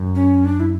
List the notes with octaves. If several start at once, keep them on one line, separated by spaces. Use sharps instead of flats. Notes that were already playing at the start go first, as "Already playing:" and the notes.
Already playing: F#2
C#4
D4
E4